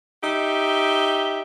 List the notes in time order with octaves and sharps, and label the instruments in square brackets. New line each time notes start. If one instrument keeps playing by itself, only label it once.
[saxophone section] D#4 G4 E5